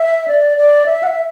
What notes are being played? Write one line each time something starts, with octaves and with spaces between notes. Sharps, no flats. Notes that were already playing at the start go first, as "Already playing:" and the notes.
Already playing: E5
D5
D5
E5
F#5
E5